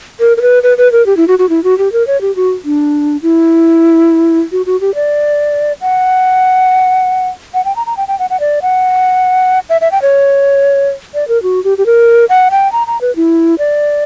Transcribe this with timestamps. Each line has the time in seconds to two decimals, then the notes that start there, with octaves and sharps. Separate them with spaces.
0.20 A#4
0.37 A#4
0.42 B4
0.63 B4
0.78 B4
0.92 A#4
1.06 G4
1.17 E4
1.28 F#4
1.39 F#4
1.49 E4
1.64 F#4
1.78 G4
1.92 A#4
2.07 C#5
2.21 G4
2.36 F#4
2.65 D4
3.22 E4
4.52 F#4
4.66 F#4
4.81 G4
4.95 D5
5.81 F#5
7.54 F#5
7.65 G5
7.76 A#5
7.87 A#5
7.97 G5
8.08 G5
8.19 F#5
8.30 F#5
8.40 D5
8.62 F#5
9.70 E5
9.81 E5
9.92 G5
10.02 C#5
11.14 D5
11.28 A#4
11.43 F#4
11.64 G4
11.78 G4
11.86 A#4
12.29 F#5
12.51 G5
12.72 A#5
12.87 A#5
13.01 B4
13.16 E4
13.59 D5